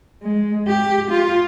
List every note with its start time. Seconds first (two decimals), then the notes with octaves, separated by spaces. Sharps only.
0.23 G#3
0.68 G4
1.11 F4